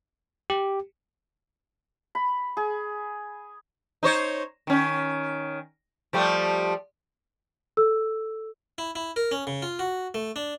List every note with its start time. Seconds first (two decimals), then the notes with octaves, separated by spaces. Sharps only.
0.50 G4
2.15 B5
2.57 G#4
4.03 D#4 C5 C#5
4.67 D#3 C#4
6.13 F3 G3 A3
7.77 A4 E6
8.78 E4
8.95 E4
9.16 A#4
9.31 C#4
9.47 C#3
9.62 F4
9.79 F#4
10.14 A3
10.36 D4